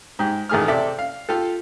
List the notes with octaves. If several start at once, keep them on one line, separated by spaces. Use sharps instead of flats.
G#2 G4
A1 D#3 A3 G#4 D#6 F6
C3 A4 D5 E5
F5
F4 G4 A4